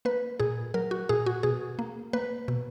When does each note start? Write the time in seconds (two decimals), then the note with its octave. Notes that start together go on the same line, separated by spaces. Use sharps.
0.05 A#3 B4
0.40 A#2 G#4
0.74 F#3 A#4
0.91 F#4
1.09 A#2 G#4
1.26 F#4
1.43 B2 G#4
1.79 A#3
2.13 A#3 B4
2.48 B2